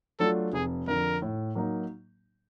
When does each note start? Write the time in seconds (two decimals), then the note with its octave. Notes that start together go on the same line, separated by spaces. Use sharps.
0.20 F#3 A3 D4 F4 A4
0.53 F1 G#4
0.87 F2 D3 A#4
1.22 A2
1.55 F#3 A#3 D#4